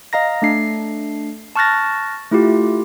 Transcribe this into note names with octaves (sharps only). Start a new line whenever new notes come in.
D#5 F5 A#5 A#6
A3 D4 C7
A5 C#6 F6 F#6 A6 A#6
A3 E4 F4 G4